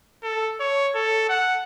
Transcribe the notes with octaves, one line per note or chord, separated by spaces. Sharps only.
A4
C#5
A4
F#5